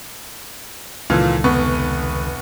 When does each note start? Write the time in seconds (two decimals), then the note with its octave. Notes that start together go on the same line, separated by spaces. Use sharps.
1.10 C#2 A#2 D#3 E3 F4 A4
1.44 F1 B3 C#6